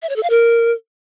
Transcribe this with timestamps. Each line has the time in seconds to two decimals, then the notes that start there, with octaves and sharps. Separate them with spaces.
0.02 E5
0.09 C#5
0.16 A4
0.23 F5
0.30 A#4